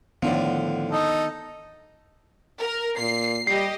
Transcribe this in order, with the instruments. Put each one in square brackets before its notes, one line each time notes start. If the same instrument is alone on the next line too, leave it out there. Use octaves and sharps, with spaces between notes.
[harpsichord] A2 D3 F3 [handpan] D#3 B3 D4
[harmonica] D#4 A4 D#5
[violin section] A#4
[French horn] A#2 [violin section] C7
[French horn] G3 [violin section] G4 D#5 [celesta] C7